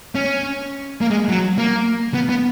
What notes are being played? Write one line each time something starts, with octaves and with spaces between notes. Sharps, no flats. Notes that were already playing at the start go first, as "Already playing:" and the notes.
C#4
A#3
G#3
F#3
A#3
B3
B3